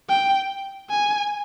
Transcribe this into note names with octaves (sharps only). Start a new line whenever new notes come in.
G5
G#5